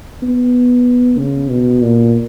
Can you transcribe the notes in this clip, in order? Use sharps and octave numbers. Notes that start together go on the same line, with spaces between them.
B3
C#3
B2
A#2